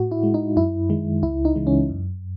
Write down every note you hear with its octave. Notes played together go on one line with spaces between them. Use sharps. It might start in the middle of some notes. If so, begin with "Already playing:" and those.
Already playing: A2 F#4
E4
G#3
D#4
F#2 E4
D#3 G#3
C#2 E4
D#4
C#3 E3 G#3
C#4
F#2